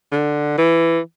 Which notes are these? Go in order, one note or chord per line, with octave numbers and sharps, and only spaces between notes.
D3
E3